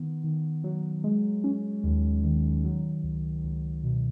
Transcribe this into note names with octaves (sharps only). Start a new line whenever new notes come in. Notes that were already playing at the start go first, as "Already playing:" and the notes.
Already playing: D#3 B3
D#3
F#3
G#3
C#4
D#2
D#3
F#3
C#2
C#2
B2